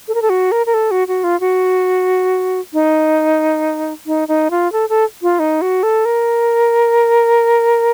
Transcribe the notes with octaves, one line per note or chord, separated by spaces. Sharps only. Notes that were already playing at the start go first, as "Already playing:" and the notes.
A4
A#4
A4
F#4
A#4
A#4
A4
F#4
F#4
F4
F#4
D#4
D#4
D#4
F4
A4
A4
F4
D#4
F#4
A4
A#4